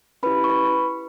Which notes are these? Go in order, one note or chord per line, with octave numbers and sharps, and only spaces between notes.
C#4 E4 G4 B4 B5
C#6
B4 B5